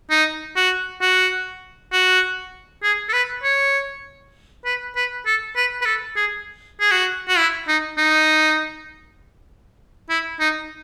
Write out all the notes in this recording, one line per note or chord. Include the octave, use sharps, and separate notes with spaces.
D#4
F#4
F#4
F#4
G#4
A4
B4
C#5
B4
B4
A4
B4
B4
A4
G#4
G#4
F#4
F#4
E4
D#4
D#4
E4
D#4